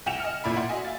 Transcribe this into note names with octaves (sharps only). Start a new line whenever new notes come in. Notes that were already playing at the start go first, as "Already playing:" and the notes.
C2 F#5 G5 C#7 E7 F7
D#5 G#5 F6
A1 A#2 E4 D5 E5 B5
D5 F#5 C6
F#4 D#5 E5 G#5
E5 F5 A6